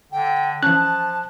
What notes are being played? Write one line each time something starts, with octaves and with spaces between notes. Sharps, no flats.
D3 G5
E3 F3 C#4 A5 F#6